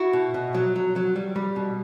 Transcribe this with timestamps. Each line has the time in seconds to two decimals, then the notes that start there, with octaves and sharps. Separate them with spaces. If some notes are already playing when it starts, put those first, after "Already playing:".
Already playing: E4 F#4
0.13 B2
0.34 B2
0.54 F#3
0.76 F#3
0.96 F#3
1.16 G3
1.36 G3
1.56 B2